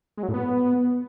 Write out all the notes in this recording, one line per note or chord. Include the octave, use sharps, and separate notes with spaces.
G#3
F#3
A2
B3